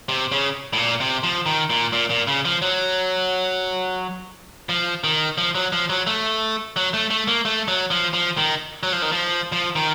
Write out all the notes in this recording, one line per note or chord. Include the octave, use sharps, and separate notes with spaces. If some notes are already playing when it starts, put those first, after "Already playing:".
C3
C#3
A2
A#2
C3
F3
D#3
A#2
A#2
A#2
C#3
F3
F#3
F3
D#3
F3
F#3
F3
F#3
A3
F#3
A3
A3
A#3
A3
F#3
F3
F3
D#3
F#3
F3
D#3
F3
F3
D#3